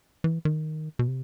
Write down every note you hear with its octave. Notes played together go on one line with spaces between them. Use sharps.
E3
D#3
B2
C3